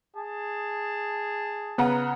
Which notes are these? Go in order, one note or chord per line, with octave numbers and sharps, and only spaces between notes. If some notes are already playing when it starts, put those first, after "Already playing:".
G#4 A5
C#3 B3 F#5 A#5